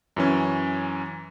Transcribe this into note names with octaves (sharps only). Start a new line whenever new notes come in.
F#2 E3 C#4